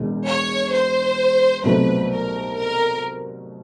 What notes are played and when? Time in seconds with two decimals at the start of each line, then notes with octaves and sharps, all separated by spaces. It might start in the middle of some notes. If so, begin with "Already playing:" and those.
Already playing: E1 E2 B2
0.26 C#5
0.71 C5
1.63 C2 B2 F#3 A3 C4 B4
2.11 A#4
2.57 A#4